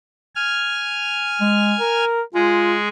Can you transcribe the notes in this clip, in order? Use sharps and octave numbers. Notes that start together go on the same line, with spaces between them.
G#5 F6
G#3
A#4
G#3 F4 G#4